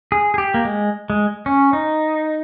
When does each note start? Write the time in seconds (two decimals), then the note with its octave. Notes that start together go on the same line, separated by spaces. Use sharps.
0.12 G#4
0.34 G#4
0.38 G4
0.54 A#3
0.65 G#3
1.10 G#3
1.46 C#4
1.73 D#4